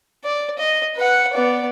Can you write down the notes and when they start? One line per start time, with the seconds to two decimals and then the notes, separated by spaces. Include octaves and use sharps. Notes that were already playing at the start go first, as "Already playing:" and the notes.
0.24 D5
0.58 D#5
0.96 B4 F#5
1.33 B3 D5